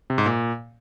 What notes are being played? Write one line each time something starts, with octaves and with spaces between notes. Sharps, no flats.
C3
G#2
A#2